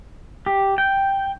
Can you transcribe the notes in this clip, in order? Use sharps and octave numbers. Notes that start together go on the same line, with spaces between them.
G4
G5